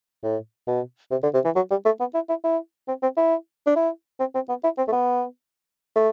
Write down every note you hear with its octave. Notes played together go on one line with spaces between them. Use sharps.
A2
B2
C3
D3
C3
E3
F#3
G3
A3
B3
E4
E4
E4
C4
C4
E4
D4
E4
C4
C4
B3
E4
C4
A3
B3
A3